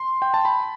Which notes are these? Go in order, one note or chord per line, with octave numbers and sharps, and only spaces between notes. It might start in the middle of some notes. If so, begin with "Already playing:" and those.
Already playing: C6
G5
A5
B5